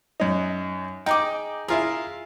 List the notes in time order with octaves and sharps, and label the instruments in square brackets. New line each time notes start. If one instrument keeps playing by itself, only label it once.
[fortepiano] F#2 D#4
[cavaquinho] D#4 G#4 D6 [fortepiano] G5
[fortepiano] E4 F4 G#4 [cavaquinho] A#4